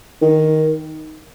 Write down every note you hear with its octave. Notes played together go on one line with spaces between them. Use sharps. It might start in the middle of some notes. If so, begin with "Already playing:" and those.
D#3